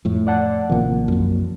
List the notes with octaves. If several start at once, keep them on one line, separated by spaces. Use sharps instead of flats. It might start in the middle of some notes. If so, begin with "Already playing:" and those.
F2 A2
D5 F#5 A5
A1 C3 D#3 F3 A#3
C2 F#2